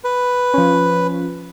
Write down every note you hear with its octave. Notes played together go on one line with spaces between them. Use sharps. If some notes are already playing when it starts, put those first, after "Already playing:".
B4
F3 C#4